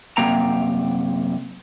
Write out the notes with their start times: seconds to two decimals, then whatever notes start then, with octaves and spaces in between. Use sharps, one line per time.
0.17 F#2 C3 A#3 G5 A#5